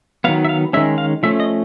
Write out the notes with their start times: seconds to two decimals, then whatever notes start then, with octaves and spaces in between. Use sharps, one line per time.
0.24 D#3 F#3 B3 F5
0.45 E5
0.49 F5
0.73 D#3 G#3 C#4 E5
0.98 F5
1.23 F3 A3 C#4 E5
1.40 D#5